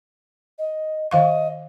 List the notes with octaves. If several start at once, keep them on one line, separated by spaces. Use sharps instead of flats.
D#5
D#3 D#5 F5 C#6